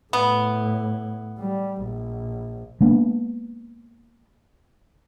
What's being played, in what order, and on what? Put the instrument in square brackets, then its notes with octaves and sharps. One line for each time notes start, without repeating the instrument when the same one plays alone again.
[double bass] A2 [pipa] B3
[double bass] G3
A#1
[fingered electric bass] G#3 A#3 B3 D4